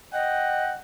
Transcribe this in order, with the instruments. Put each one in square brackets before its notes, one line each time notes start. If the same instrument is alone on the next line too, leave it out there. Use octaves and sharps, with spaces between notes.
[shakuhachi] D#5 [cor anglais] F#5 [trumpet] G5